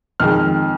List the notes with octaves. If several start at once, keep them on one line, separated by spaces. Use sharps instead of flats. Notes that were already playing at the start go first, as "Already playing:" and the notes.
F2 D#3 G#3 F6